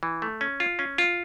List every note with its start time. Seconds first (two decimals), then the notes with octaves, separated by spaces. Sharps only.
0.03 E3
0.22 A3
0.41 C#4
0.60 F4
0.79 C#4
0.98 F4